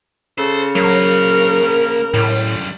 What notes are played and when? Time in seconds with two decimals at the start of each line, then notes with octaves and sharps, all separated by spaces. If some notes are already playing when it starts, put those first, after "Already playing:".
0.38 C#3 A4 C5
0.75 F#3 A#3 A#4 C5
2.14 F#2 A2 G3